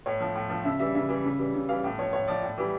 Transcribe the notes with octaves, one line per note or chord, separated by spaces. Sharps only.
A2 C#5
F3
A2
F3
C#3 E5
E3 G3 E5
C#3 E5
E3 G3
C#3
E3 G3
C#3
E3 G3 F5
A2
F3 C#5
A2 C#5
F3 D5
A2
E3 G3